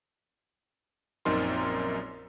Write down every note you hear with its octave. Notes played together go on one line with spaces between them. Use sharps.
A#1 F#2 C4 D#4 A#4 C6